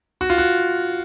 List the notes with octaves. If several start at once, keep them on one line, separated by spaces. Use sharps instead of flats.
F#4
F4
F#4